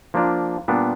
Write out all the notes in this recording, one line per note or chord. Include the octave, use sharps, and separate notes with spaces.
F3 A#3 D4 F4
A#2 G3 B3 D4